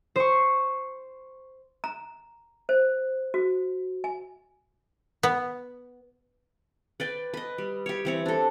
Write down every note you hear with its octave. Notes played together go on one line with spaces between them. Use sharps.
C5 C#6
A#5
C5
F#4
G#5
B3
B4 D5 G5
B4 D#5
G3
G4 C#5
E3 C4 C#5
D4 A4